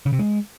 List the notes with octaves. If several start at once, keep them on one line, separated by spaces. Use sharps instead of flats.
C#3
C3
G#3